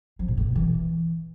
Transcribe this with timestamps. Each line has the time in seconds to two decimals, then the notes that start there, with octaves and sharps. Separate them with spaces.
0.19 F3
0.28 A#2
0.37 A2
0.46 B2
0.56 E3